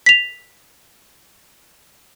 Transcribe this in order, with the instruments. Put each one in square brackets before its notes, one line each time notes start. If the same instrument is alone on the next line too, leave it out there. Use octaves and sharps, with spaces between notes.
[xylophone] B6 F7